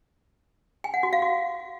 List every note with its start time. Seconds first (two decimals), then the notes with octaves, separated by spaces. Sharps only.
0.84 G#5
0.94 F#5
1.03 F#4
1.13 F5
1.22 F#4